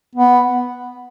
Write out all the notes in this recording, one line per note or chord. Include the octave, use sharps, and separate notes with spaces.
B3